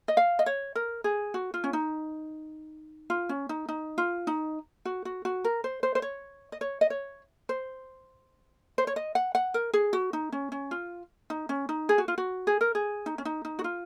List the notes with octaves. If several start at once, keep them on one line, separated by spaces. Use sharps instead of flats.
D#5
F5
D#5
C#5
A#4
G#4
F#4
F4
C#4
D#4
F4
C#4
D#4
D#4
F4
D#4
F#4
F#4
F#4
A#4
C5
C5
C5
C#5
D#5
C#5
D#5
C#5
C5
C5
C#5
D#5
F#5
F#5
A#4
G#4
F#4
D#4
C#4
C#4
F4
D#4
C#4
D#4
G#4
F#4
F4
F#4
G#4
A#4
G#4
D#4
C#4
D#4
D#4
F#4
F4